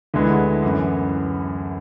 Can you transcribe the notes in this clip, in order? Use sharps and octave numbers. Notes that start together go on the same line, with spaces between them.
D2 D3 G#3 B3 E4
F#2 E3 B3